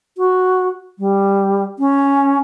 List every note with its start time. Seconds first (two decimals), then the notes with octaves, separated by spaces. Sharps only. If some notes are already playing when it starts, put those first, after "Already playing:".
0.18 F#4
0.99 G3
1.79 C#4